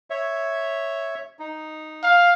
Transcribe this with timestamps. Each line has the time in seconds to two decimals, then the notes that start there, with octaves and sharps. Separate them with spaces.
0.10 C#5 E5
1.39 D#4
2.03 F5